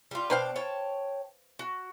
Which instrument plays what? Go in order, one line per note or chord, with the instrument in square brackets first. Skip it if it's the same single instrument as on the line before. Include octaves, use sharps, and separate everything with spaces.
[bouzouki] G3 F4
[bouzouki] B2 D4 G5 [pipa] B4 C5 F5
[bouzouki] C#5 G5 A5
F#4